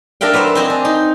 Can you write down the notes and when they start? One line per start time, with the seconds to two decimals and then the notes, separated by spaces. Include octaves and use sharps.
0.21 D4 A#4 E5 F5 G5
0.33 F#3 B4 C5 E5
0.55 C4 C5 D#5 G#5 A#5
0.70 D4
0.85 D#4